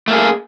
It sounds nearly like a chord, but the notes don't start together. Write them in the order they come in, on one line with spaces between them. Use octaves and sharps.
A3 A#3 G#4